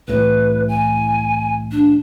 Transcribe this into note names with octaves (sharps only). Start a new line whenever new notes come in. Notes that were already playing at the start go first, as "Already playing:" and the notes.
C2 A2 E3 B4
G#5
D4